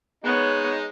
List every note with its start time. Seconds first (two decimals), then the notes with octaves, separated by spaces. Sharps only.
0.24 G#3 B3 D#4 C#5